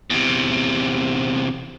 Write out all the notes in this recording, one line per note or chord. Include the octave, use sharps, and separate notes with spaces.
E2 C3